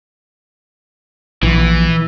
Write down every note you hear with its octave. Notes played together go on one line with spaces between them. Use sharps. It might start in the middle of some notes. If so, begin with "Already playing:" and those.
A#1 E3